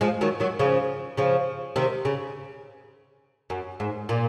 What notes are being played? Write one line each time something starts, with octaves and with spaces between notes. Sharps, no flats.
F3 G#3
D#3 F#3
D#3 F#3
C#3 F3
C#3 F3
C3 D#3
C#3
F#2
G#2
A#2